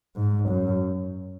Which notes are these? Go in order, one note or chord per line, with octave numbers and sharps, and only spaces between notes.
G#2
F#2